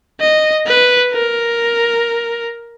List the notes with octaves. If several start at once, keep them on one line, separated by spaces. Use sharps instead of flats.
D#5
B4
A#4